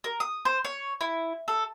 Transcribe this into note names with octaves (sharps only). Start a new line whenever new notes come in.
A#4
D#6
C5
C#5
E4
A4